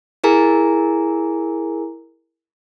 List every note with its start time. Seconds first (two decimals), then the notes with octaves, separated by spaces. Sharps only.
0.24 E4 G#4 A#4 G#5 A#5